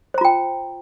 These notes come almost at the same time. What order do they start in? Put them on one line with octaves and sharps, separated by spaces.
C5 A#5 F4 G5